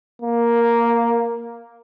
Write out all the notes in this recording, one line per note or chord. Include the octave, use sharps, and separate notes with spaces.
A#3